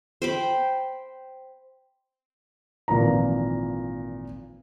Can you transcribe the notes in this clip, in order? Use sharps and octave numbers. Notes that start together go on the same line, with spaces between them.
C5 G5 B5
G#1 A#2 E3 F3 A#5